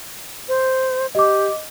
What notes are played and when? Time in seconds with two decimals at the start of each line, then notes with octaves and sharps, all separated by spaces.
0.48 C5
1.15 G4 D#5 D6